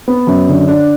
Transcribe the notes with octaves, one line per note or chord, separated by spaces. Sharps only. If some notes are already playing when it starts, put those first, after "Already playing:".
B3
F#2
D3
D4